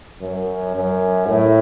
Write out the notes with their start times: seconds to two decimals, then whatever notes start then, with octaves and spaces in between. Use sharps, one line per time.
0.21 F#2
0.75 F#2
1.28 A2